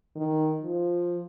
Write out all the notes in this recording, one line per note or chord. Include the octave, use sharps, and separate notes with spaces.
D#3
F3